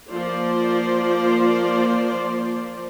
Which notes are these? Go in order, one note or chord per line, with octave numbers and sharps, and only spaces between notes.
F3 A#3 F4 C5 D5